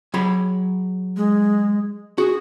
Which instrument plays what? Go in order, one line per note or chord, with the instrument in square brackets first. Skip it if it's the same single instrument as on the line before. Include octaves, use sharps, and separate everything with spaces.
[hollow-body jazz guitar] F#3 G#4 B5
[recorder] G#3
[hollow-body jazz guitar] F#4 [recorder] G#4